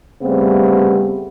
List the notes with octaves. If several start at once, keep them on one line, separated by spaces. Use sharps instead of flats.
C#3 G3 A3 B3 C4